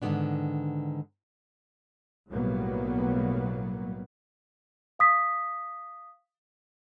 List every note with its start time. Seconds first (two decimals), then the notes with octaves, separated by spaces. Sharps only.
0.02 G#2 D3 D#3 G#3 B3 D4
2.30 B1 A2 F#3 G3 A#3 B3
4.99 F5 D#6 B6